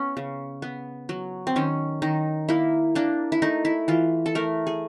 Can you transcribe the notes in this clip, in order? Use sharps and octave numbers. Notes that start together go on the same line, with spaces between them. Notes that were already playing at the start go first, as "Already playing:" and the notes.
Already playing: B3 C#4
C#3
B3
F#3
C4
D#3 C#4
D#3 D#4
A#3 E4
A#3 D4
E4
A3 D#4
E4
E3 F4
A4
A3 A#4
G#4